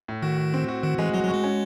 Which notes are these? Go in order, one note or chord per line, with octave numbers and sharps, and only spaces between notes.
A2
D#3 F#4
F#4
C4
F#4
D#3 F#4
E3 G#3
F#3 F#4
F#3
F#4
G#3
C#4